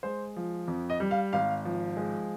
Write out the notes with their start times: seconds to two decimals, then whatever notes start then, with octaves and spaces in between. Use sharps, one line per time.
0.03 G#3 C5
0.36 F3
0.68 F2
0.90 D#5
1.00 G3
1.11 F5
1.33 G#1 F5
1.65 F3
1.97 G#3